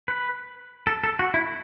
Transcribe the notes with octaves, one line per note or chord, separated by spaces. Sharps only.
B4
A4
A4
F#4
E4